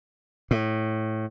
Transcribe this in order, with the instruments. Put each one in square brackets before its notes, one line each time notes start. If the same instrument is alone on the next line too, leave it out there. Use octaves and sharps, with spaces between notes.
[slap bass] A2